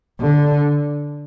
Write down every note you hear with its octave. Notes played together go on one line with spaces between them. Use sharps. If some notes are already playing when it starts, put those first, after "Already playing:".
D3